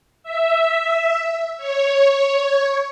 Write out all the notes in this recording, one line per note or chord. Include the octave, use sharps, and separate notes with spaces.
E5
C#5